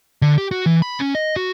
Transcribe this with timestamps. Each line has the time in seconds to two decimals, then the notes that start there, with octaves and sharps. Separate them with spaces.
0.22 D3
0.38 G4
0.51 F#4
0.66 E3
0.82 B5
1.00 C#4
1.15 D#5
1.36 F#4